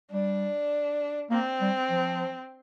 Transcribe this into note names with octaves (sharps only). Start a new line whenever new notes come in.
G3 D4
A#3 C4
G3
F3